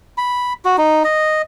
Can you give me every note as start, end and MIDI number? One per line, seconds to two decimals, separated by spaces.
0.18 0.53 83
0.65 0.76 66
0.78 1.03 63
1.04 1.42 75